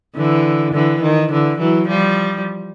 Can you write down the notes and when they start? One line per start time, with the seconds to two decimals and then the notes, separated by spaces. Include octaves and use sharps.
0.16 D3 E3
0.74 D3 E3
1.03 D#3
1.30 D3 E3
1.59 E3 F#3
1.88 F3 G3